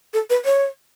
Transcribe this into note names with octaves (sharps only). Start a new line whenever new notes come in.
A4
B4
C#5